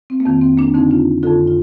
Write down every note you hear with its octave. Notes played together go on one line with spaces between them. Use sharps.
C4
A#3
F2 D#3 C4
C4
A#3 D4
F2 D3 C4 D#4
D4 F4
F2 D3 F4 A4
F4